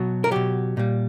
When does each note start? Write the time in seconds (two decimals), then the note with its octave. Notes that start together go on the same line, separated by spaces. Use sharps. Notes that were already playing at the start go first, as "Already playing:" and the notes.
Already playing: B2 F#3
0.24 A#4
0.31 B2 F#3 G4
0.77 A#2 G3